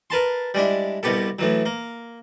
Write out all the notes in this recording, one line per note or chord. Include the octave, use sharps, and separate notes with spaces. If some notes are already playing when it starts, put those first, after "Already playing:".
A#4 B4 A5 C6
G3 G#3 D4 E4
C2 B2 B3 G4 A4
A2 E3 F#3
A#3